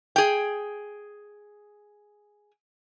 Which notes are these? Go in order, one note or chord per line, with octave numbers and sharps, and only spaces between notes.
G#4 G5